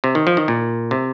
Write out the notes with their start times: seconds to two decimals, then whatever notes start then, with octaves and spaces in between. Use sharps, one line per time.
0.04 C3
0.15 D#3
0.27 F3
0.37 D#3
0.48 A#2
0.91 C3